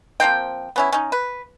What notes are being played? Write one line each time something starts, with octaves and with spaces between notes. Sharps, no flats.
F3 A#3 C4 G5
B3 C#4 E4
C#4 D#4
B4